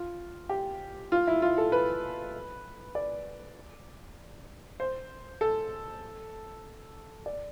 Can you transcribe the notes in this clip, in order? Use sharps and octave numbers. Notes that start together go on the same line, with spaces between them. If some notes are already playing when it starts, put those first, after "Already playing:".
Already playing: F4
G4
F4
E4
F4
A4
B4
D5
C5
A4
D5